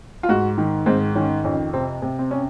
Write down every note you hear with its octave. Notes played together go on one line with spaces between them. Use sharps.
F4
G#2 F#4
D#3
G#2 C4
D#3 C#4
F2 C#4
C3 C4
C3
C4
C#4